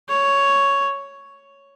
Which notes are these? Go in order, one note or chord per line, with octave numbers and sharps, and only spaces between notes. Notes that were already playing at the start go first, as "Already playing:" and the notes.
C#5